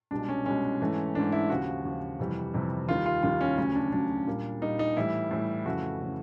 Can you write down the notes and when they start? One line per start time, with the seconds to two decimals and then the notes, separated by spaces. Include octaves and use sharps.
0.11 C2 B2 G#3 D4
0.29 C#4
0.46 C2 B2 G#3 C#4
0.80 G#2 E3 A3
1.15 G#2 E3 A3 D4
1.32 E4
1.50 D#2 C#3 F3 F#4
1.85 D#2 C#3 F3
2.20 F2 C3 E3 G3
2.54 F2 C3 E3 G3
2.89 D#2 D#3 G3 F4
3.06 F4
3.23 D#2 D#3 G3 F4
3.41 C#4
3.58 D2 C#3 F#3 C#4
3.75 D4
3.92 D2 C#3 F#3 D4
4.27 A#2 G3 A#3
4.61 A#2 G3 A#3 D#4
4.79 D#4
4.97 A2 E3 G3 E4
5.31 A2 E3 G3
5.66 F2 C#3 E3 A3 F#4
6.01 C#3 E3 A3